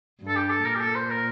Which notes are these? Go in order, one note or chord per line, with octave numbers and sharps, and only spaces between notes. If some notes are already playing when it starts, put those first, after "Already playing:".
G2
A4
G4
A4
A#2 A#4
G4
A4
C5
A#4